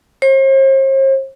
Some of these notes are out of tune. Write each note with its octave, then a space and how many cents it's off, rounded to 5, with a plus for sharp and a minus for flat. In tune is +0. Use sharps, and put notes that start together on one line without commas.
C5 +45